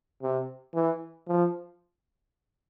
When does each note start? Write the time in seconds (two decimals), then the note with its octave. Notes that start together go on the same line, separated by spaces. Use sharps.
0.22 C3
0.74 E3
1.28 F3